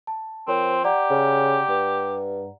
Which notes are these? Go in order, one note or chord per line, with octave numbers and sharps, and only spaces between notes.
A5
F3 C4 A#4 C#5 C6
G4 D5 F#5 A#5
C#3
G2